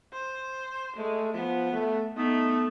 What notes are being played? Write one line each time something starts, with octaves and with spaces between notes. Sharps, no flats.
C5
G#3 A3
F3 B3
A3
A3 B3 D#4